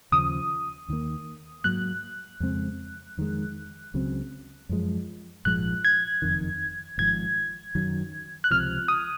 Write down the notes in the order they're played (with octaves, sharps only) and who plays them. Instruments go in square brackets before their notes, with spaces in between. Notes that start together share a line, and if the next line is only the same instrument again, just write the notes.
[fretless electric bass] D#2 C#3 F3 [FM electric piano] D#6
[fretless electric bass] D#2 D#3 A#3
[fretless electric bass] G#2 F#3 A#3 [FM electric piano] F#6
[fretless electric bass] F2 C#3 G#3 C4
F2 D#3 G#3
C#2 C#3 F#3 C4
F#2 F3 G#3
[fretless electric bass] A#1 G#2 F3 G#3 [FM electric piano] F#6
[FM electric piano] G#6
[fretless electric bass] F#1 F2 D#3
[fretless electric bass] G#1 G#2 F3 [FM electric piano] G#6
[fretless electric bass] F#2 D#3 F#3
[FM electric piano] F#6
[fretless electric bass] C#2 C3 F3 [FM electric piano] F6
[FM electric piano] D#6